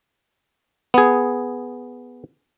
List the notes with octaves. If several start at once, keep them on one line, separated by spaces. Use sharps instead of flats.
B3 G#4